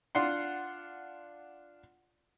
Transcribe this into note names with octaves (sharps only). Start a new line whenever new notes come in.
D4 F4 F#5 C6